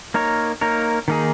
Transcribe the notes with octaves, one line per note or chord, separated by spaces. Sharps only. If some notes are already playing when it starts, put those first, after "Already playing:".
A#3 D#4 A#4 C#5
A#3 D#4 A#4 C#5
D#3 A#3 D#4 G#4